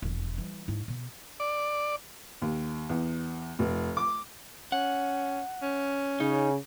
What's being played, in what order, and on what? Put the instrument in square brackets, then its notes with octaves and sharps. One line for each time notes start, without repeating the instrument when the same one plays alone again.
[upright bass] E1 F2
E3 G3
G#2 E4
B2
[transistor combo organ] D5
[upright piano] D#2
E2
F1
D6
[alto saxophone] C#4 [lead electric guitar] F#5
[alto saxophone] C#4
[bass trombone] C#3 [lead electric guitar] D#4